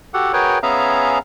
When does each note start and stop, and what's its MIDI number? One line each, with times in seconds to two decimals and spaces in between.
0.14 0.32 66
0.14 0.32 67
0.14 0.32 69
0.14 0.32 78
0.33 0.58 66
0.33 0.58 68
0.33 0.58 70
0.33 0.58 71
0.33 0.58 73
0.33 0.58 79
0.63 1.19 59
0.63 1.19 61
0.63 1.19 68
0.63 1.19 76
0.63 1.19 77
0.63 1.19 82